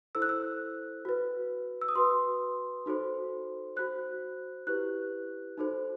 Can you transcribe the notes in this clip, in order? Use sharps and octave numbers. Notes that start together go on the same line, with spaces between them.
E4 A4 C5 E6
F#6
E6
F#4 B4
E6
D#6
F#4 B4 C6
D#4 F#4 A4 C5
F#4 C5 F#6
E4 G4 B4 F#6
D#4 F#4 A4 C5